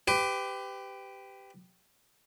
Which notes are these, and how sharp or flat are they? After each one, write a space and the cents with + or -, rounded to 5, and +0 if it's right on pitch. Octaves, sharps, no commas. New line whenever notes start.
G4 +0 B4 +35